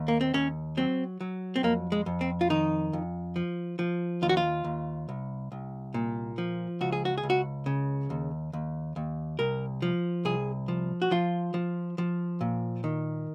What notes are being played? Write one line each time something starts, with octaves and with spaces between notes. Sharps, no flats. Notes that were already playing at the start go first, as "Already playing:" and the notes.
Already playing: D#2
A#3
C4
D#2 C#4
F#3 C4
F#3
C4
F2 A#3
G#3
F2
C4
F4
D#3 D#4
F2
F3
F3
D#2 F4
F#4
F4
D#2
C2
C2
A#2
F3
C#2 F#4
G#4
F#4
G#4
C#2
F#4
C#3
D#2
D#2
D#2
C2 A#4
F3
C2 G#4
F3
F#4
F3 F4
F3
F3
A#2
D#3